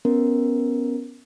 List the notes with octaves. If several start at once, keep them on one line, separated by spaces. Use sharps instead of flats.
B3 C#4 A#4